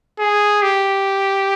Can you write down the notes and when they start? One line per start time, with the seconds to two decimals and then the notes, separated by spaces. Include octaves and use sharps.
0.19 G#4
0.63 G4